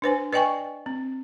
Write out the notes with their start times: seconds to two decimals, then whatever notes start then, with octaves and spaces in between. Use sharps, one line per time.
0.02 D4 B4 C5 G#5
0.33 B4 D5 D#5 G5 G#5 C#6
0.86 C4